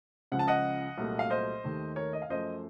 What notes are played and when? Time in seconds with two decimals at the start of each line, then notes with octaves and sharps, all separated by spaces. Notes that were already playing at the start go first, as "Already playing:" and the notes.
0.32 C#2 C#3 F3 F#5
0.39 A5
0.48 D#5 F#5
0.98 C2 A#2 F#3 A3
1.19 F5
1.30 C5 D#5
1.64 D#2 D#3 A3
1.96 A#4 C#5
2.13 D#5
2.22 F5
2.29 F#2 F3 A3 C5 D#5